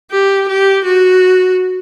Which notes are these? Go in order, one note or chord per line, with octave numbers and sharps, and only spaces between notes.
G4
G4
F#4